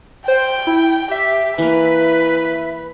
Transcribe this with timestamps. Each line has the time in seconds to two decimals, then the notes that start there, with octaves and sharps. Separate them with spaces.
0.28 C5 G5
0.67 E4
1.11 G4 E5 B6
1.58 E3 A#3 B4